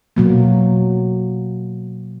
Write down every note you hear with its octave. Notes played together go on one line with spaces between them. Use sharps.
B2 F#3 A#3